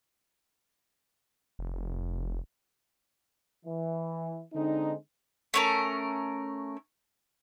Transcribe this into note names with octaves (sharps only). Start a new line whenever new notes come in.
F1
E3
D3 G#3 C4 D4 D#4
A3 C#4 A#4